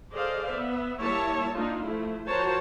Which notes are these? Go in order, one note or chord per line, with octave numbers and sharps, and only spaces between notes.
G#4 A4 C5 D5 D#5 F5
B3 E5
G3 A#3 E4 C#5 E5 A5
A#3 D4 D#4 F4
F3 A3 E4
F3 F#4 A#4 C5 C#5 A5